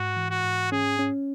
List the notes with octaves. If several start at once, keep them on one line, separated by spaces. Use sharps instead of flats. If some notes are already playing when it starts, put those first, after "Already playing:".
Already playing: G#2 F#4
E3
F#4
G#2
C#4 G#4
C#4